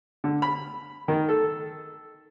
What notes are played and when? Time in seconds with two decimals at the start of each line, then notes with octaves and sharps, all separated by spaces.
0.24 D3
0.42 B5
1.08 D#3
1.29 A4